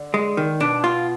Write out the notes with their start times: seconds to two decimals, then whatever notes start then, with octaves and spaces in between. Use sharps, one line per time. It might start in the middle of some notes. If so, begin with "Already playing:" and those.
Already playing: D3
0.14 G#3
0.37 D#3
0.60 B2 D4
0.84 F4